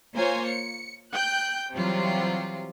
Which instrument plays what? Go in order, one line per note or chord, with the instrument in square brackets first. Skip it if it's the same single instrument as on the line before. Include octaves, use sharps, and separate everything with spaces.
[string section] A#3 F4 C5 C#5 G#5
C#7
G5 F#6 G6
C3 E3 F#3 G3 F4